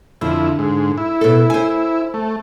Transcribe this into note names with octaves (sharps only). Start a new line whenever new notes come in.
F2 D3 E4
G#2
E4
B2 A4
C5 G#5
A3